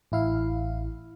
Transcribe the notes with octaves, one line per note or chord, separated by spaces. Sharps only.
A1 E4 F5